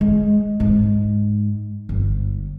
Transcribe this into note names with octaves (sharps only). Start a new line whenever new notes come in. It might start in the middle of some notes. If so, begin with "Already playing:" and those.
G#3
G#2
G1